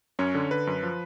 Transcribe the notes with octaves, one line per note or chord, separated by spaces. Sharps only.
F#2 C#4 C#5
D3
D3 B4
F#2
F3